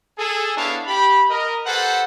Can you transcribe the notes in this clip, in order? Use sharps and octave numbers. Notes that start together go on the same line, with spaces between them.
G#4 A4
B3 D4 E4 C#5 F5 A5
G4 B5
A#4 D#5
G4 A4 B4 C5 F#5